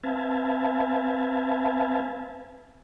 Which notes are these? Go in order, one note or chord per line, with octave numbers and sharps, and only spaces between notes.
C4 B4 E5 F5 G#5 A5